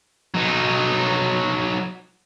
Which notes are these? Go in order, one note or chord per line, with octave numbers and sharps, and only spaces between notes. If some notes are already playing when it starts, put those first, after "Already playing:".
F#3 D#4